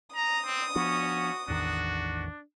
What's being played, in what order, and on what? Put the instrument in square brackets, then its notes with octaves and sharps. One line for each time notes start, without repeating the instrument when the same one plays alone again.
[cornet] A#5 [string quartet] D#6
[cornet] C4
[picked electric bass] F3 B3 D4 [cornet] C#4 [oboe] F#4
[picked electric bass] A1 E2 D#3 [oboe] D4 [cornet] F#4